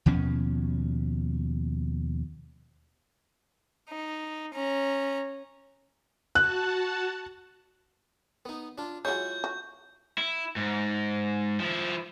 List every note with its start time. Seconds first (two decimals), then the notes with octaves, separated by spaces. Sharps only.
0.06 D#2 B2 F3 C#4
3.90 D#4
4.54 C#4 A#5
6.35 F#4 F#5 A5 F#6
8.46 B3 D#4
8.78 D4 F4
9.05 F#3 G#3 E4 F4 C#5 G6
9.44 F#4
10.18 E4
10.56 G#2
11.60 F3 E4